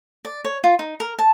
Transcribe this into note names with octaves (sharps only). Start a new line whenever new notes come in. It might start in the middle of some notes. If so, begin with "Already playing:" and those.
D5
C#5
F4
D#4
A#4
A5